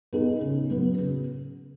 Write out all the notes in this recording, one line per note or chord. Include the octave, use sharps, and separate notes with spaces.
B3 D#4 G#4 B4
C#3
F#3 B3
C#3